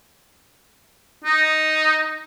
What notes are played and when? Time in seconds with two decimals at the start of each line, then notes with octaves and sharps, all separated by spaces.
1.24 D#4